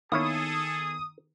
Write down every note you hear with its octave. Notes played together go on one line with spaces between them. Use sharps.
D#3 A#3 B3 E4 G#4 A4 C#5 D#6